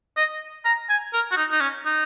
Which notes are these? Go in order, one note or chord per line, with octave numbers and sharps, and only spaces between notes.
D#5
A#5
G#5
A#4
F#4
D#4
D#4
C#4
D#4